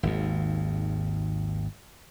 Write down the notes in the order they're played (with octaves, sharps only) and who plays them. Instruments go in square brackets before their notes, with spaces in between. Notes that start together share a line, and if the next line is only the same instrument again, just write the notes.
[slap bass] G#1 D#2